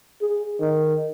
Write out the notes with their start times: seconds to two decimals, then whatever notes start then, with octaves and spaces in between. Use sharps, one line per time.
0.22 G#4
0.60 D#3